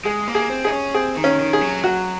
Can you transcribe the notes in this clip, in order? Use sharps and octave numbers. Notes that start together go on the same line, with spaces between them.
G#3 G#4
A#3
G#4
C4
D#4 G#4
C#4
C4 G#4
D#3
C#4
D#3
G#4
F#3
F#3 F#4